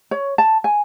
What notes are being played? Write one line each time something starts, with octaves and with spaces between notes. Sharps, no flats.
C#5
A5
G#5